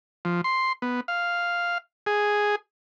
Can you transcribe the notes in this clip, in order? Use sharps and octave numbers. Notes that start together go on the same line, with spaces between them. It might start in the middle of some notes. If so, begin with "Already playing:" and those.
F3
C6
B3
F5
G#4